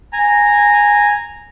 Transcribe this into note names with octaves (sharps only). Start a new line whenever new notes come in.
G#5 A#5